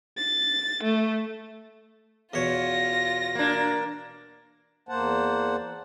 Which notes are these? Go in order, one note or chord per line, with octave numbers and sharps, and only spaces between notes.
A6
A3
E2 B2 F4 C#5 A#6
A#3 D4
E2 A#3 C5 F#5 A5